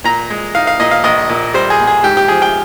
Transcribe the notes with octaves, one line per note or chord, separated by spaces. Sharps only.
A#2 A#5
G#3
D#4 F5
F5
A#2 D#5
F5
A#1 D#5
A#2
G3 C5
G#4
A#1
G#4
G#2 G4
G4
F3 G#4
G5